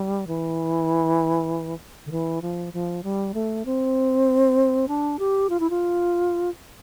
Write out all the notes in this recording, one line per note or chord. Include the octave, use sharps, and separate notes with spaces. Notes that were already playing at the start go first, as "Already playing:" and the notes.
Already playing: G3
E3
D3
E3
F3
F3
G3
A3
C4
D4
G4
F4
E4
F4